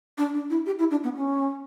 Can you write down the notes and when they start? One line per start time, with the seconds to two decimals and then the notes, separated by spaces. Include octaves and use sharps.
0.18 D4
0.34 D4
0.50 E4
0.66 G4
0.79 E4
0.91 D4
1.04 B3
1.16 C#4